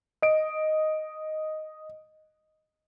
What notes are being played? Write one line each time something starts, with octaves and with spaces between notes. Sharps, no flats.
D#5 D7